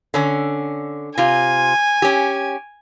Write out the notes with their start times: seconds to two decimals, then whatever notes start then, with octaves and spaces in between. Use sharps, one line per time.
0.14 D3 C#4
1.18 C3 F4 G#5
2.02 C#4 G4